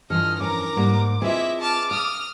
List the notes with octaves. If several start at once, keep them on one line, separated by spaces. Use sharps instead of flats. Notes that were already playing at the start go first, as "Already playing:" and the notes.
G2 E3 F4 A4 D#5 F6
F2 C#4 A#4 A#5 D6
G#2 G3 A#3
C4 E4 F4 G#4 B4 D#5 E5
A5 D6 F6
F5 D#6 F6